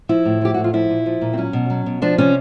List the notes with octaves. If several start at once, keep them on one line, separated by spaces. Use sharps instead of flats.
F3 E4
A2
F3 G4
A2 F#4
F4
F3 E4
A#2
F3
A#2
C4
F#3 C#4
B2
F#3
B2
F3 D4
C3 C#4